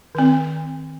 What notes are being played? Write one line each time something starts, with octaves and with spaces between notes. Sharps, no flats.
D#3 C4